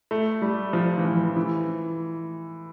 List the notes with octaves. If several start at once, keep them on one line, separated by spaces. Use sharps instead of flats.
A3
G3
F3
E3
F3
E3